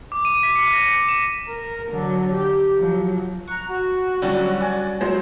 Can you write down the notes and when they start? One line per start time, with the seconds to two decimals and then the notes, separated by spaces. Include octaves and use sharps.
0.12 D6
0.25 D#7
0.43 B6
0.56 C#7
0.73 A#6
0.88 C#7
1.09 E7
1.48 A#4
1.90 D3 F#3
2.33 G4
2.76 F3 F#3
3.48 A#5 C#6 F#6
3.68 F#4
4.22 D3 F#3 G3 C#4 D4
4.61 D5 G#5
5.01 F#3 G#3 C5